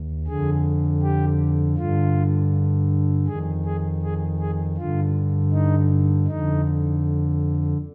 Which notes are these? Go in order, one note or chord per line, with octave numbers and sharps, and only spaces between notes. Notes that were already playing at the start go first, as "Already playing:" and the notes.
Already playing: D#2
F2 D3 G#4
G4
G2 D3 F4
F2 D#3 G#4
G#4
G#4
G#4
G2 D3 F4
D#4
F2 D3 D#4